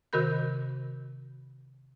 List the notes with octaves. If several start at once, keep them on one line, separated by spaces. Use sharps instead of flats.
C3 D#3 F#4 A#4 B5 G6